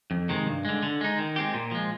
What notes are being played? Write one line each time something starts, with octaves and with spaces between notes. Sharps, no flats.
F2
C3 D#3 G#3
G2
D3 G#3
D3
G#3 D#4
D#3
G#3 C4 G4
A#2
F3 G#3